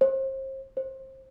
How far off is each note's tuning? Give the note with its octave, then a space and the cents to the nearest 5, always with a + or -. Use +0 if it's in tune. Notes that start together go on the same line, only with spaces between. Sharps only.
C5 +35
C5 +25